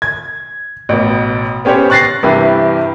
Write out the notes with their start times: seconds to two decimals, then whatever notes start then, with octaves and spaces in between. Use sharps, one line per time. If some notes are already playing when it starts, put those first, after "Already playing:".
0.02 G#6
0.89 A1 B2
1.65 B3 C#4 G4 C5 C#5
1.90 C#6 F#6 A6 A#6 C7
2.23 G2 C3 E3 G4